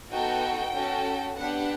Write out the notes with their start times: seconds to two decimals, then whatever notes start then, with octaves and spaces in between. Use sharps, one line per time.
0.12 B3 D#4 F#4 A4 G5
0.75 C#4 F#4 A4
1.37 B3 D4 G4 F#5